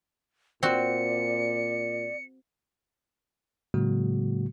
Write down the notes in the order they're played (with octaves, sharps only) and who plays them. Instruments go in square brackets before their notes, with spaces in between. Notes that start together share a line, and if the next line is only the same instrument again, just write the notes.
[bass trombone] A#2 [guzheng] C4 F#4 [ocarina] D5 [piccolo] C#7
[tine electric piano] A2 C#3 F#3 G#3 A#3 F#4